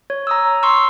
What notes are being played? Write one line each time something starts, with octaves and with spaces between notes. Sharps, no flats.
C#5
A#5 D#6 E6
C6 C#6 E6